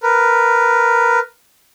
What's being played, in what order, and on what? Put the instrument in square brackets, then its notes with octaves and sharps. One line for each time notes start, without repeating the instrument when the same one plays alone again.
[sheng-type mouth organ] A#4 B4